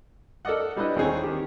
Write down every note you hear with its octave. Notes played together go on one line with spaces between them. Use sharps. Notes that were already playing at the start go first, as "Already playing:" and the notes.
A4 A#4 D5 D#5 F#5
G3 D4 E4 B4 D#5
D#2 C4 D#4 G#4 C#5
D#3 G4